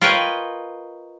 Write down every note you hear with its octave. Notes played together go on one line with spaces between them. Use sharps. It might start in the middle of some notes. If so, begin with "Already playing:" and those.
F4 A#4 B4 C#5 D#5 G5